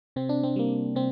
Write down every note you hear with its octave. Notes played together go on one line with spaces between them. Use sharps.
C3 C4
D4
C4
G3 A#3
C3 C4